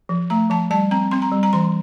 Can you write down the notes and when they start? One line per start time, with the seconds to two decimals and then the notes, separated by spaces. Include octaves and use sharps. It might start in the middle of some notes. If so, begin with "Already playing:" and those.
0.09 F3
0.30 A3 A#5
0.50 F3 A5
0.71 G3 A5
0.91 C4 A#5
1.11 C4 C6
1.22 A#5
1.32 G3
1.43 A#5
1.53 E3 C6